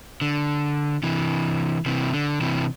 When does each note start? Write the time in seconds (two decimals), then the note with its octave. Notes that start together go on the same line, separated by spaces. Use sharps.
0.21 D3
1.03 C3 E3
1.86 C3 E3
2.13 D3
2.41 C3 E3